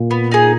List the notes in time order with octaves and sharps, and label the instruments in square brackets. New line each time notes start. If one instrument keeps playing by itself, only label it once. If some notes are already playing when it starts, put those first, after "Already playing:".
Already playing: [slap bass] A#2
[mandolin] B3
D#4 G#4